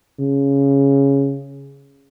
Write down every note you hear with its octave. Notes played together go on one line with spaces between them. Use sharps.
C#3